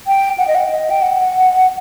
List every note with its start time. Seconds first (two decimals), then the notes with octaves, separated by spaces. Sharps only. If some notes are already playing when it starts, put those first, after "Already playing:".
0.07 G5
0.38 F#5
0.48 D#5
0.55 F#5
0.70 D#5
0.90 G5
1.02 F#5